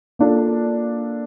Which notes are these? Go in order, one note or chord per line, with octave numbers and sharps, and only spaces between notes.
A#3 D4 F4 A4